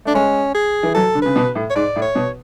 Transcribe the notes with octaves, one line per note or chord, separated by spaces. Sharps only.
A3 D4
G#3 C#4
G#4
E3
F#3 A4
D3
C#3 B4
B2
A2
C#5
G#2 D5
A2
C#5
B2